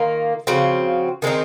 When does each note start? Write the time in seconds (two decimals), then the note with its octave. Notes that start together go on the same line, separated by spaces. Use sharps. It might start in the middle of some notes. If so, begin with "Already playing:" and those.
Already playing: D#3 A#3 F4
0.47 C#3 F3 C4 F#4
1.22 D#3 G#3 C4 D#4